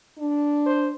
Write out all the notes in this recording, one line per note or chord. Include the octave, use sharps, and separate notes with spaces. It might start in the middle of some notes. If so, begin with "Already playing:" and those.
D4
C5